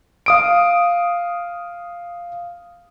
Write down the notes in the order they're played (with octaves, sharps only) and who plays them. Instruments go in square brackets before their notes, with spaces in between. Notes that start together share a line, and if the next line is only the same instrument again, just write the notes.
[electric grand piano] F5 D#6 D7